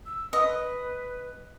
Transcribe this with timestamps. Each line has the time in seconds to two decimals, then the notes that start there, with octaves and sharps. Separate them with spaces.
0.06 E6
0.33 B4 D#5